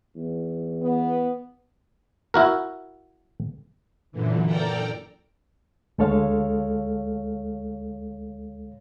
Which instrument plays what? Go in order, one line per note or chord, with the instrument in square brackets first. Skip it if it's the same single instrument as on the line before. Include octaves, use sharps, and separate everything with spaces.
[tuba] E2
[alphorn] B3
[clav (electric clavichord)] E4 F#4 A#4
[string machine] F#2 A#2 D3 E3
A4 A#4 D5 G5 A#5
[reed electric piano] D2 G#3 A4 C#5 F5